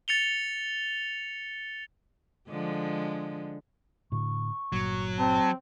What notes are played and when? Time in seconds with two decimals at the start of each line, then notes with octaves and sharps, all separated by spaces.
0.08 A6 C#7 F7 G7
2.49 D3 F3 G#3
4.12 A2 D3 C#6
4.72 G1 A#2 F#3
5.18 C4 A5